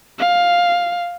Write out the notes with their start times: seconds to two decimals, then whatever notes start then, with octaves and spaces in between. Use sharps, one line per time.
0.19 F5